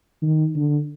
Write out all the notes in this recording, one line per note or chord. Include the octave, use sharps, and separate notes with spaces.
D#3
D3